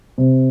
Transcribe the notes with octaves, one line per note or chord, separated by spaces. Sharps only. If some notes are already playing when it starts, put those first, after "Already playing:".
C3